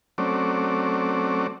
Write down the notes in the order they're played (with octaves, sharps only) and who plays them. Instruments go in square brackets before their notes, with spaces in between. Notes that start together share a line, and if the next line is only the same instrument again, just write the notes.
[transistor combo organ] F#3 A3 C4 C#4 D5